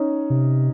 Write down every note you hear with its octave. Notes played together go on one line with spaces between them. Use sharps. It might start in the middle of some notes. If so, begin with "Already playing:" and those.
Already playing: C#4 D#4
C3